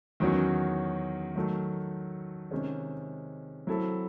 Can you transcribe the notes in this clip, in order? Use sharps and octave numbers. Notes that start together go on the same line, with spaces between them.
E2 D#3 F#3 C#4 F#4
D#3 F#3 A3
C3 D#3 G#3 C#4
F#3 C4 E4 A4